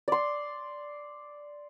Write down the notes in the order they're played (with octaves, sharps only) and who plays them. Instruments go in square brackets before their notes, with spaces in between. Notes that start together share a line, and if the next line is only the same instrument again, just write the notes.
[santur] D5 C6